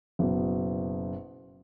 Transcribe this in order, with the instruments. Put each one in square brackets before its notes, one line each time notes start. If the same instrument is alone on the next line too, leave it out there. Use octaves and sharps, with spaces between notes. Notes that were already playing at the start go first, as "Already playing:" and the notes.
[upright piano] F#1 B2